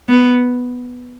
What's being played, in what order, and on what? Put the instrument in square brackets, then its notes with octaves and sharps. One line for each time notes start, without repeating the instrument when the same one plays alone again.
[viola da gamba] B3